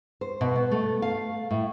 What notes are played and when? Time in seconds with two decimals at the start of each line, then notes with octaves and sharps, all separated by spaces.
0.21 C5
0.41 B2
0.56 B3
0.71 A3
1.02 F5
1.51 A2